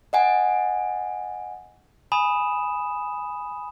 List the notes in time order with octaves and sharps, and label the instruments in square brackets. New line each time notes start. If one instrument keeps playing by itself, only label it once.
[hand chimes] D#5 F#5 G#5
[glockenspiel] G#5 B5 D#6 E7